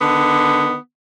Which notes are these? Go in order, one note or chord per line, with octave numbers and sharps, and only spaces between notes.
D3 D#3 B3